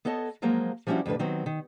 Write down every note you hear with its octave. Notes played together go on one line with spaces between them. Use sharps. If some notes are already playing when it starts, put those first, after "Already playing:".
B3 A4 C#5 D#5 A5
F3 F#3 G#3 A#3 C5
F3 G3 C#4 D4 E4 F#4
F2 A2 D3 B4
D#3 F#3 B3 C4
D#3